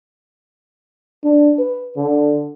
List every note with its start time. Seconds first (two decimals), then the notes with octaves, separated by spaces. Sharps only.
1.24 D4
1.58 B4
1.97 D3